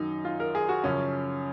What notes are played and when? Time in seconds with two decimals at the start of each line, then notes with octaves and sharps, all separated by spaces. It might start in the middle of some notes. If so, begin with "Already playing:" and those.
Already playing: F#2 D#3 F#3 D#4
0.25 F4
0.40 A#4
0.55 G#4
0.69 F#4
0.84 F#2 C#3 F3 C#4